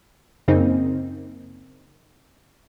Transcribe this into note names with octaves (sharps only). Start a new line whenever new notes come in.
F#2 C#3 A#3 C4 D#4